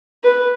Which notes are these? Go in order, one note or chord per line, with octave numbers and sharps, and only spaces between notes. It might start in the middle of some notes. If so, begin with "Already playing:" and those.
B4